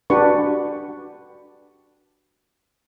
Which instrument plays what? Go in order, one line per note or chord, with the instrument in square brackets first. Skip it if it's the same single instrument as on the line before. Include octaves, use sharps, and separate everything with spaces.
[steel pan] D4 F#4 G4 B4 C#6